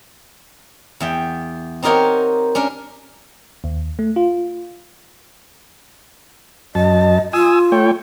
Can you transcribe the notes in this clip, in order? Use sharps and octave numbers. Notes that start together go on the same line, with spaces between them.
E2 E5 G5
C4 D#4 G4 A#4 C#5 F#5
C#4 D4 A#4
D#2
A3
F4
F#2 D#5 A5
F4 G#5 D#6 E6
A3 C#5 G5